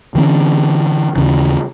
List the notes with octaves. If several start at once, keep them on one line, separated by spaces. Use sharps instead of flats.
D3 E3 C4 C#4
D#2 C#3 E3